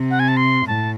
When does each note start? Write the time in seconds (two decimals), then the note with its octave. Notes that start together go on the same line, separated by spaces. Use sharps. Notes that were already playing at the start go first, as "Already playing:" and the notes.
Already playing: C3
0.10 F#5
0.20 G#5
0.28 A5
0.37 C6
0.67 A2 A5